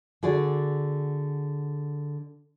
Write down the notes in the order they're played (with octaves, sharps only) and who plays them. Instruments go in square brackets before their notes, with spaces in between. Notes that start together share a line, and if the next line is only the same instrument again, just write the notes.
[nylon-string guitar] D3 F#4 G#4 D5